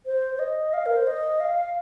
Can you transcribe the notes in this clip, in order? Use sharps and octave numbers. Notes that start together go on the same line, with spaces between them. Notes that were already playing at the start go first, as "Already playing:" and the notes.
C5
C5
D#5
F5
A#4
C5
D#5
F5